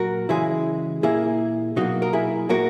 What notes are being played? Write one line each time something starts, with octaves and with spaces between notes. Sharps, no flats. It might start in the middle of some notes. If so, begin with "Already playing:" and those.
Already playing: A#2 F#3 A#3 F#4 A#4
C#3 E3 G#3 E4 G#4
A#2 A#3 E4 G#4
B2 F#3 A#3 D#4 F#4
A#4
E4 G#4
A#2 F#3 A#3 F#4 A#4